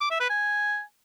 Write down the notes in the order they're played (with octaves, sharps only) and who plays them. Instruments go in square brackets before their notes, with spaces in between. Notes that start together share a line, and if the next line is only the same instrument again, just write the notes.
[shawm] D6
E5
B4
G#5